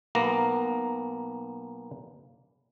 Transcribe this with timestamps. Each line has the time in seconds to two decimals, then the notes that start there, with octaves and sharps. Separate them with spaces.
0.15 B1 A#3 B3 A#5